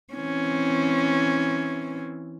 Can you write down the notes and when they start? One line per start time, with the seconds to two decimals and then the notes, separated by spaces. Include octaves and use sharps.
0.14 E3 C4 C#4